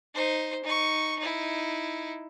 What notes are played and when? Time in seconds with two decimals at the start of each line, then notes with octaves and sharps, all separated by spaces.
0.15 D#4 C5
0.64 D#4 C#6
1.19 D#4 E4